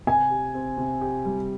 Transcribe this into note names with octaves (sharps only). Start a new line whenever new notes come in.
C3 G#5
G4
C4
C3
G4
G3